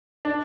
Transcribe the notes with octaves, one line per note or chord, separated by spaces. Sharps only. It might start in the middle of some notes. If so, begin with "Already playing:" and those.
D4